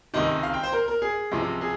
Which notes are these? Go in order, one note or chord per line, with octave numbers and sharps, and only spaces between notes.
C#2 C3 D#3 D#5
F5
G5
C5
A#4
A#4
G#4
C#2 C3 F3
G#4